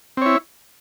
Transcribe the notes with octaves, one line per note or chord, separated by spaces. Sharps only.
C4 E4 C#5